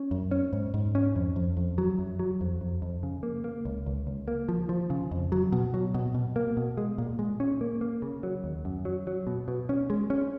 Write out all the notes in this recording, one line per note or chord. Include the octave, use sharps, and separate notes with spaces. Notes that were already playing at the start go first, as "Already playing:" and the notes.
Already playing: C#4
F#2
C#4
G#2
G#2
C#4
F2
F2
F2
F#3
F#2
F#3
F2
F2
F2
C#3
A#3
A#3
C#2
C#2
C#2
A#3
F3
F3
C#3
F2
F#3
B2
F#3
B2
B2
A#3
B2
G#3
A#2
G#3
C#4
A#3
A#3
C#3
F#3
D#2
F#2
F#3
F#3
B2
B2
C#4
G#3
C#4